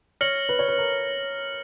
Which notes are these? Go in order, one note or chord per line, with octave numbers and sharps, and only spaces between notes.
C#5 F6 A#6 C#7 F#7
B4
C#5
B4
A#4